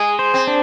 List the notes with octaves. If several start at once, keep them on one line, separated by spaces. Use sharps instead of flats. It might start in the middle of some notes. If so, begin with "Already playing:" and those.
Already playing: G#3 G#4
C5
C4
D4